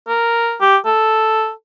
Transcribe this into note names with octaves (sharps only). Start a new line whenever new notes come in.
A#4
G4
A4